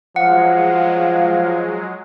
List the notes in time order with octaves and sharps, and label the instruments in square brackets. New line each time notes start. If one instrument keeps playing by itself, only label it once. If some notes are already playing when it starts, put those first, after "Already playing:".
[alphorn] F3 [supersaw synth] F#3 G#3 [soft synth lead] F5 [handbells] F#5